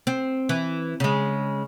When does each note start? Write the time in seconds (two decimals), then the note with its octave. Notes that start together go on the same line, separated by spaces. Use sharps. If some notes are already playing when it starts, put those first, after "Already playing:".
0.07 C4
0.49 E3
1.00 C#3 G#3